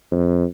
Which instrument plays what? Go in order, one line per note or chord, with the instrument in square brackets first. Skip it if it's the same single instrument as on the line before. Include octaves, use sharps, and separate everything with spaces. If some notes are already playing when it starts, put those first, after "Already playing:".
[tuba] F2